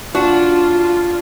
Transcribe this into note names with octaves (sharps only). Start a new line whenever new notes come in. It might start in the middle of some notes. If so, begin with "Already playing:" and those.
D4 F4 F#4